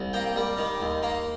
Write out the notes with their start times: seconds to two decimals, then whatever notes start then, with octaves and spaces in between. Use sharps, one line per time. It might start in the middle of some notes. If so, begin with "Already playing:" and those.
Already playing: C2
0.13 A#3 G5
0.36 G3
0.58 D#3
0.80 D#2
1.03 A#3